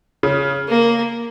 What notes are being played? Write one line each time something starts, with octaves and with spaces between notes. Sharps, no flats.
C#3
A#3